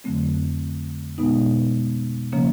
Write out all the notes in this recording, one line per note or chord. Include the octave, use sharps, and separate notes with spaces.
F2 D3 F#3 A3 C4
B2 G#3 B3 D#4
C#3 F3 A#3 C#4